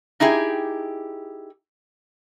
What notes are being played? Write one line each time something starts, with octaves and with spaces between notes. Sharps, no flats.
D#4 E4 G4 G#4